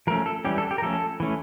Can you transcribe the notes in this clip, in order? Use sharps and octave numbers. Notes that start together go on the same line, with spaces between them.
F3 A3 C#4 A#4
A4
E3 G3 C#4 G4
A4
G4
A#4
F3 A3 C#4 A4
E3 A3 C#4